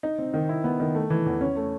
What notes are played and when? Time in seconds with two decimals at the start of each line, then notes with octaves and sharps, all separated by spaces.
0.03 D#4
0.18 C4
0.34 D#3
0.49 E4
0.64 B3
0.80 D#3
0.95 A3
1.10 E3
1.26 E2
1.41 C#4
1.56 A3